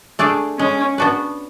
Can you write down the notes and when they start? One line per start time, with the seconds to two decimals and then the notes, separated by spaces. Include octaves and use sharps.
0.19 A3 D4 G#4 D5
0.58 G#3 C#4
0.98 B3 D4 F#4 B4